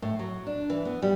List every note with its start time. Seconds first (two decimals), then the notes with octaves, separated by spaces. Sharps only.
0.02 A2
0.19 F#3
0.46 D4
0.70 E3
0.85 B3
1.02 G3